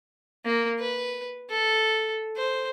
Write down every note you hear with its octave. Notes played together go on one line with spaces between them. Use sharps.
A#3
B4
A4
C5